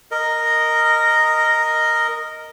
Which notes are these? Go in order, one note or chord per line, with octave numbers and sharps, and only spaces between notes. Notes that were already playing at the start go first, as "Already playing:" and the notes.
A#4 D#5